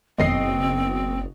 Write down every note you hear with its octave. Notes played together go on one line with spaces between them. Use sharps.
F#1 F2 B2 D#3 G#3 C4 D#5 C7